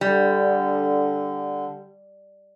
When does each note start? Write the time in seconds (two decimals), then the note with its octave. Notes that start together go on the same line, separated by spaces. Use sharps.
0.01 D3 G3